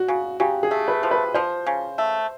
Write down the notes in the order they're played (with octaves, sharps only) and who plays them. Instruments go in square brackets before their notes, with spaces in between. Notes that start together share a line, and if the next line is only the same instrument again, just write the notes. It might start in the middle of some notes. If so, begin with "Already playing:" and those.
Already playing: [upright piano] F#4
[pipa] C#3
[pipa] C#3 [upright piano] G4
[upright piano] G#4
[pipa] A3
[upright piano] B4
[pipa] F3
[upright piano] B4
[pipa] F3 [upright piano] C5
[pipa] C#3
A3